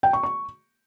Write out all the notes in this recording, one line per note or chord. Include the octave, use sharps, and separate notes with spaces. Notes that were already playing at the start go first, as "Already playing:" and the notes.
G5
C#6
C#6